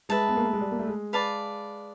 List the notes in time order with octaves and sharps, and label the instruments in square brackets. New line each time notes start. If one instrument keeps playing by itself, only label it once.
[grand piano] G#3 [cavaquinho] B4 E5 A5
[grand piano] B3
A#3
A3
G#3
G3
A#3
A3
G#3
[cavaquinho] B4 D5 F5 A5